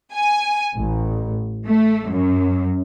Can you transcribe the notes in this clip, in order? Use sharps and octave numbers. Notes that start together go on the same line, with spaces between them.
G#5
A1
A3
F#2